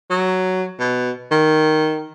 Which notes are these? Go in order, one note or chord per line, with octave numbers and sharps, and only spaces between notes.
F#3
B2
D#3